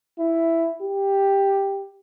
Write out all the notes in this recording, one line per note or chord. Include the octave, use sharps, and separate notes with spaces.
E4
G4